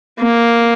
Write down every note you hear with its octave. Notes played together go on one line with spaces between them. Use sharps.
A#3